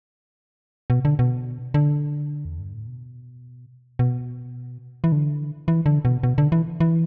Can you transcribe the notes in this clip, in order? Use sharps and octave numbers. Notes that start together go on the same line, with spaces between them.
B2
D3
B2
D3
E2
G2
A2
B2
B2
E3
D3
E3
D3
B2
B2
D3
E3
E3